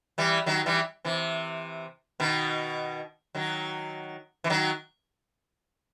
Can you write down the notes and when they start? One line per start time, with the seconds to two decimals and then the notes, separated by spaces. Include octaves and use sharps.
0.18 E3 G3
0.46 D#3 F#3
0.66 E3 G3
1.05 C3 E3
2.20 B2 D#3
3.35 D#3 F#3
4.44 E3
4.50 D#3 F#3